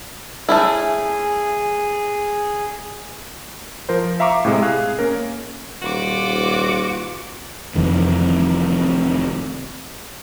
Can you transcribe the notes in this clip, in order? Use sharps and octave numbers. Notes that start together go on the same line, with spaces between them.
A3 C#4 E4 G#4
F3 A#4 C5
E5 F5 A#5 C#6 D6
A2 C3 G#3
G#4 F5 F#6
A#3 C#4 A#4
D#1 F4 F#4 D6
F1 F2 D#3 E3